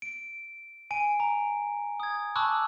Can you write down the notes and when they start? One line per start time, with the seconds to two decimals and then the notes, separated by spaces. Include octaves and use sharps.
0.02 D7
0.91 G#5 D7
1.20 A#5
2.00 D#6 G#6
2.36 A5 B5 C#6 D6 E6 F#6